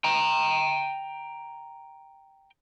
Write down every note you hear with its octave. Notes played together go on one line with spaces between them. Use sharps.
G5 A#5